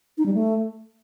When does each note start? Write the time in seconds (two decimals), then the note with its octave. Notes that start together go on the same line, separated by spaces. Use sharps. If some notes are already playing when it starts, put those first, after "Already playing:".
0.18 D#4
0.26 G3
0.34 A3